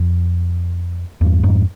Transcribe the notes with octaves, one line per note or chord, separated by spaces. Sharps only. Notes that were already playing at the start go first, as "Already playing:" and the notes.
Already playing: F2
E2 G2
F2 G#2